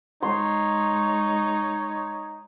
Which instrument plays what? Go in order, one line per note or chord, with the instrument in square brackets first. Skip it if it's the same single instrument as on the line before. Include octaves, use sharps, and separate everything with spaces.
[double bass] G#3 [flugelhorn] D#4 [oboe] C#5 [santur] C6